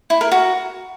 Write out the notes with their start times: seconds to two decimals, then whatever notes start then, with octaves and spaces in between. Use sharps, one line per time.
0.10 E4
0.21 A#4
0.32 F#4